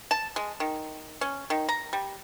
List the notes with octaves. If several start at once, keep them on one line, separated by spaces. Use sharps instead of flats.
A5
G#3
D#3
C#4
D#3
A#5
G3